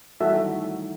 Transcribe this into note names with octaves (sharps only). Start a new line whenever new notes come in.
E3 G3 F#4 A4 E5
D#3 F#3